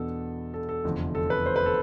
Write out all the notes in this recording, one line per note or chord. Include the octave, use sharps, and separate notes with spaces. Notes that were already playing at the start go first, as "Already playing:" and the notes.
Already playing: E2 B2 B3 D4 A4
A4
A4
F1 E2 D3 F3
A4
B4
C5
B4
A4